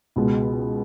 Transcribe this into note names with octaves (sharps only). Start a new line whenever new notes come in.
C#2 B2 G#3